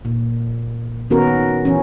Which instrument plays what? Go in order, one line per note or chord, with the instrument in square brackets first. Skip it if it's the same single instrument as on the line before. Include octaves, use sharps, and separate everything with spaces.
[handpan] A#2
D#3 B3 C#4 F#4 A#4
E3 C#4